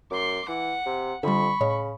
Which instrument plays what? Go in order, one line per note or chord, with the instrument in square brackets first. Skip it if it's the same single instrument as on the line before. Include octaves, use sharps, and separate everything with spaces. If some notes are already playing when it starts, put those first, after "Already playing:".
[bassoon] F#2 [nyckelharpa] C6 D6
[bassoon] E3 [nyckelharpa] F#5
[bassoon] C3
[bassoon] F2 [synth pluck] D3 G3 [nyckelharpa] B5 C#6
[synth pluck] A2 C#5 D#5 [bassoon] C#3